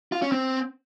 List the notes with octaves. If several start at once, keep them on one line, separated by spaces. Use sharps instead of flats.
F4
C#4
C4